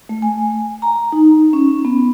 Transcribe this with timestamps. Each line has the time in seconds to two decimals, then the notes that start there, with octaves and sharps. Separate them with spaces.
0.09 A3
0.22 G#5
0.82 A#5
1.12 D#4
1.53 C#4
1.85 B3